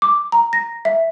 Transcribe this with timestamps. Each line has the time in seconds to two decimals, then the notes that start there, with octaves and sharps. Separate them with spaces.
0.02 D6
0.32 A#5
0.53 A#6
0.85 E5